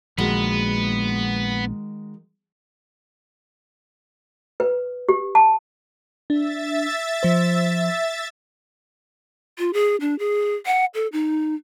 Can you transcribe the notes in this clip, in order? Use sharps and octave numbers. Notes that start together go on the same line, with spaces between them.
A#1 D#3 G#3 B3 F#4
B4
G4
A5
D4 E5 A6
F3 C5
F4
G#4
D4
G#4
F#5
A4
D#4